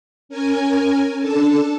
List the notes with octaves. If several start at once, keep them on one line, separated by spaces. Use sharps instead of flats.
C#4 A#4 G#5
D4 A4 A5